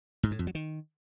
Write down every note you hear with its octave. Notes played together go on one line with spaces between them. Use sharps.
G#2
A2
F2
F#3
D#3